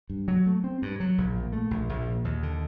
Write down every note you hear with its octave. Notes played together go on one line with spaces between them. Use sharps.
G2
F#3
A3
C4
G2
F#3
A#1
A#2
A3
A#1
A#1
A#2
D#2
D3